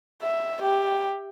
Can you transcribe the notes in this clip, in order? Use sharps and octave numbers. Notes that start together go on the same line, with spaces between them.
E5
G4